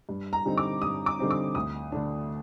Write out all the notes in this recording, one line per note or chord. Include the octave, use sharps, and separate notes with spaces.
G2
A#5
D3 G3 C4 D#4
D6
G2 D#6
D6
D3 G3 C4 D#4
D6
D2 D#6
D3 A3 D4